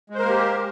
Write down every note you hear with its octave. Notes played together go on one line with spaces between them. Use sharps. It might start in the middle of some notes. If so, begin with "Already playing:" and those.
G#3 A#3 G4 A#4 C5